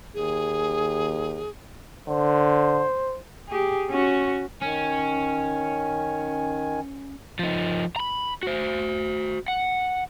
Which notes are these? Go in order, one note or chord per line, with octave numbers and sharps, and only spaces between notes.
D#2 G#4
D3 C5
G4 G#4
C#4 F#4
D#3 C#4 G#5
F3 D#4
A#5 B5
F#4 C5
F#5